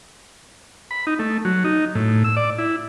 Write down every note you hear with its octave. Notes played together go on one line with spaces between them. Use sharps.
B5
D#4
A3
F#3
D#4
A2
E6
D5
E4